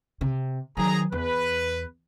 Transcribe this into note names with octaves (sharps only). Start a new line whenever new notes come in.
C3
D#3 F#3 G#4 A#5
E2 B4